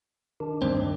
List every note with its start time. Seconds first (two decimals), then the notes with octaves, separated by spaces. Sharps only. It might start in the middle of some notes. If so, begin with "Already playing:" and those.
0.40 D#3 D4
0.62 D2 G2 C4